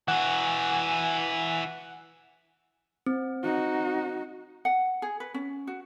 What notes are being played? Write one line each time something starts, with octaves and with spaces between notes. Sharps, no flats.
E3 F#4 F#5 G#5
C4
D#4 F#4
F#5
G#4
B4
C#4
F#4